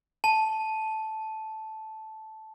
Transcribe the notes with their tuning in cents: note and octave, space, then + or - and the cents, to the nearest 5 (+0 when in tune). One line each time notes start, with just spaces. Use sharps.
A5 -10